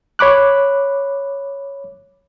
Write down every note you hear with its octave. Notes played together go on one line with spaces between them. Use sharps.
C#5 B5 D6 F#6